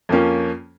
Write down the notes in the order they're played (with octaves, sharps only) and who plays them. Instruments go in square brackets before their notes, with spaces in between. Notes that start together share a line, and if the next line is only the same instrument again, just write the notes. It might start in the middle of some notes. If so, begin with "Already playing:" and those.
[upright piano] F2 F3 A#3 C#4